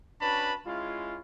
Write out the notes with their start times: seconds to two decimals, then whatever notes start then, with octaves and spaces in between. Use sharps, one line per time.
0.21 C#4 D4 F#4 B4 A5 B5
0.66 G#3 C#4 E4 F4